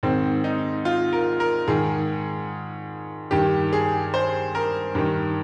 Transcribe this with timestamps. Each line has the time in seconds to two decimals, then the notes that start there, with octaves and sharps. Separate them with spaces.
0.03 G#2 D#3 C4
0.44 D#4
0.85 F4
1.13 A#4
1.40 A#4
1.68 G#2 D#3 G#4
3.31 G2 D#3 G4
3.73 G#4
4.14 C5
4.55 A#4
4.95 G2 D#3